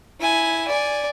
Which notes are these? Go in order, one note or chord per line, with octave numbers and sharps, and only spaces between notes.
E4 G#5
D5 G#5